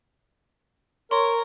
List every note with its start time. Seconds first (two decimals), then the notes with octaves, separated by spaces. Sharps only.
1.11 A#4 C#5 C6